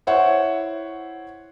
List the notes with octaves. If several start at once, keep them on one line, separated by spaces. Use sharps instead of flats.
E4 C5 C#5 E5 F#5